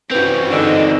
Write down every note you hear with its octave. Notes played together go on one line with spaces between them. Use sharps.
E3 C4 C#4 F#4 B4 G6 F7
G#2 D3 D#4 D#5